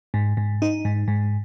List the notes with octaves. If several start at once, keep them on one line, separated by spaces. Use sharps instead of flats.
G#2
G#2
D#4
G#2
G#2